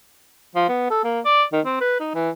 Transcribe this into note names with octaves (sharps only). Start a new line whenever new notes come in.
F3
B3
A4
A#3
D5
D#3
C4
B4
D#4
E3